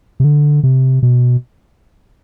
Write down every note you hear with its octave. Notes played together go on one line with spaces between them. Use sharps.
C3
D3
C3
B2